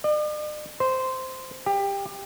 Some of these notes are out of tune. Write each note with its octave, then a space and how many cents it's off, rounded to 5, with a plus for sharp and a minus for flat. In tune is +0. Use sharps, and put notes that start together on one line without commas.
D5 +45
C5 -10
G4 +20